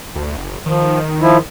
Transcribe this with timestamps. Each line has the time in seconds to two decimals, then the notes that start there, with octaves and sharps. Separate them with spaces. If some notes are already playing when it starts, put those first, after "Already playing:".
0.15 D2
0.37 F#1
0.66 D#3 F3
1.21 F3 E4